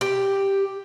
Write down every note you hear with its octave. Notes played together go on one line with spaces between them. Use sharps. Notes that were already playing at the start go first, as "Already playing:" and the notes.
G4